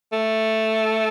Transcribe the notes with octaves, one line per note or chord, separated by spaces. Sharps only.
A3